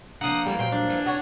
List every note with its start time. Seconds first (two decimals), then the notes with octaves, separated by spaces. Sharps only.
0.21 F3 A#3 D4 F#5 D#6
0.46 E3 G3 A3 B3
0.59 A#2 F#3 G3 G5 C6
0.72 D4
0.88 E3 F4
1.06 F#4 C#5